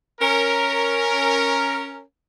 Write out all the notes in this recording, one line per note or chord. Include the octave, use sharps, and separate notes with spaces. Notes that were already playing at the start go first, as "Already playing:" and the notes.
C#4 A#4